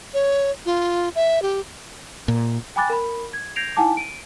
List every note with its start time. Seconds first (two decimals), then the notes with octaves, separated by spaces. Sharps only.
0.14 C#5
0.66 F4
1.15 E5
1.42 G4
2.28 A#2
2.76 G5 G#5 B5 D6 F#6 A6
2.90 A#4 B5
3.33 G#6
3.56 G6 G#6 A#6 C7 D7 F7
3.76 D#4 E4 F#5 G#5 A5 D6
3.97 D7 D#7